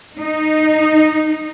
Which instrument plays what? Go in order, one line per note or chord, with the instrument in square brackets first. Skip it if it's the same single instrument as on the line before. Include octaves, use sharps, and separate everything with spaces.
[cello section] D#4